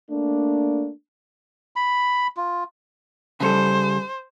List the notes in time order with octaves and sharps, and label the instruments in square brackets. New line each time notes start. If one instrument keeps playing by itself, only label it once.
[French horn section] A3 A#3 D4
[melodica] B5
F4
[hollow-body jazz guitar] C#3 G3 A4 [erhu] C5